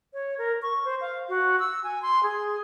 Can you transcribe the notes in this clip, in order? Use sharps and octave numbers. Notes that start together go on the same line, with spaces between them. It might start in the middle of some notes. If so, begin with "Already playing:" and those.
C#5
A#4
C#6
C5
F5
F#4
E6
G#5
C6
G#4